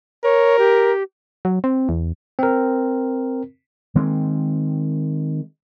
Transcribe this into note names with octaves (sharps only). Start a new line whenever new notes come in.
A#4 C#5
G4
F#3
C4
E2
C4 A#4
D#3 G#3 A#3 C4